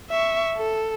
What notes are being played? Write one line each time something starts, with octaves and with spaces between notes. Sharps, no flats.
E5 C#6
A4